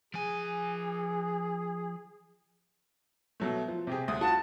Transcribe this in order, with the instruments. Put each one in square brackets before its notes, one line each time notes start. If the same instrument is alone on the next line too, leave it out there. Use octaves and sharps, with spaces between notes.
[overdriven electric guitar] F3 G#5 [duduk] G#4
[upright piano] B2 F#3 A3
F3
C3 G4 G#4
G1 D2 D#6
[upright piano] F4 F#4 [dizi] A5